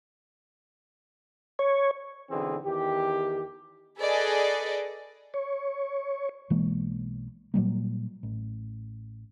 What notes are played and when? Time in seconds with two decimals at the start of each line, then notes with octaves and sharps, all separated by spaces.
1.59 C#5
2.30 B1 D3 E3 C4 G#4
2.65 E2 D#3 G4
3.98 G#4 A4 B4 D5 D#5
5.34 C#5
6.50 B1 E3 G#3 A#3
7.54 A#2 F#3 G3 A#3
8.23 A1